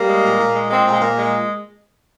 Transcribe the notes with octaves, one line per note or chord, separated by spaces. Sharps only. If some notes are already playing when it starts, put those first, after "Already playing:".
Already playing: G3 A#3
G#3
A#2
A#2
G#3
G#3 C4
A#2
G#3
A#2 A#3
G#3